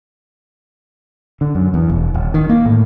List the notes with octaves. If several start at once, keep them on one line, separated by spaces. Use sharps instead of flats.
D3
F#2
E2
E1
D#1
D#3
A#3
A2